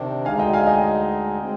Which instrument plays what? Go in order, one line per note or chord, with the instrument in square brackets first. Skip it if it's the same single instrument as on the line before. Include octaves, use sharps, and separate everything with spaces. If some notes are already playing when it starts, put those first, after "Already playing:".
Already playing: [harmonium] C3 D#3 D4
[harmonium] D2 D3 G#3 D#4 [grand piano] F5 G#5
[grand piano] D#5 G5
F5 G#5
D#5 G5
[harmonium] G#3 C4